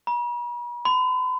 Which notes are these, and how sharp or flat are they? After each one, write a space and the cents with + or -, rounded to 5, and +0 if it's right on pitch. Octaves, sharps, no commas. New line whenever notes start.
B5 -45
B5 +45